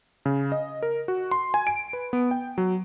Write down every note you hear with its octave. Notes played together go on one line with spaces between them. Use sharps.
C#3
D#5
A#4
F#4
C6
G#5
D7
B4
B3
G5
F#3